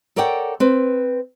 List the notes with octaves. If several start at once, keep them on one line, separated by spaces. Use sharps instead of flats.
A4 A#4 C#5 D5 F#5 G5
C4 B4